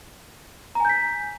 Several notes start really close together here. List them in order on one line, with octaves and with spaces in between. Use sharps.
A#5 G#5 G6 B6